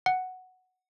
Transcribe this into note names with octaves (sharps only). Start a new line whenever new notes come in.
F#5